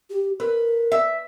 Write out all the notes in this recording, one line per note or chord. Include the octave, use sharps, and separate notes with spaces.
G4
A#4 B4
E5